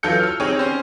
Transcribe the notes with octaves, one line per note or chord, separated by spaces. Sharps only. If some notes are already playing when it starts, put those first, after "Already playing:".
E3 F#3 F4 A4 G6 C#7
E6 F6
C4 D#4 G4 G#4 C#5 G#5
C#4 C5